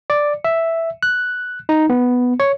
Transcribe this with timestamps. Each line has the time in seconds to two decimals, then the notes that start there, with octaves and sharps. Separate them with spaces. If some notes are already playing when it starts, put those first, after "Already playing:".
0.10 D5
0.45 E5
1.03 F#6
1.69 D#4
1.90 B3
2.40 C#5